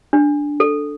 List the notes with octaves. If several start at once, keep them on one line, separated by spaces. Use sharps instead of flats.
D4
A4